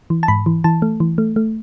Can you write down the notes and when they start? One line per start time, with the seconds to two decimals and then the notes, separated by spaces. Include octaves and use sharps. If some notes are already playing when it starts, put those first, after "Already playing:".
0.10 E3
0.23 A5
0.28 G#2 B5
0.46 E3
0.64 E3 A5
0.82 A3
1.00 E3
1.18 A3
1.36 A3